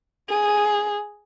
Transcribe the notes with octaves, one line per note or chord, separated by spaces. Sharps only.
G#4